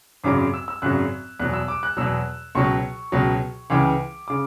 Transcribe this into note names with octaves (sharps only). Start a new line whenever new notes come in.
G#1 F#2 C#3 F#3 D6
D6
E6
E6
G#1 F#2 C#3 F#3 F#6
E2 B2 F#3 F#6
E6
D6
F#6
E2 B2 F#3 E6
C#2 B2 F#3 C#6
C#2 B2 F#3
C#2 C#3 E3 D6
C#3 D6